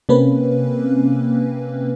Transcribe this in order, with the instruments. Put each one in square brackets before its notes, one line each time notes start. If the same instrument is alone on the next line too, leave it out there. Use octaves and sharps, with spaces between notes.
[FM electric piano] C3 A#3 C4 C#4 B4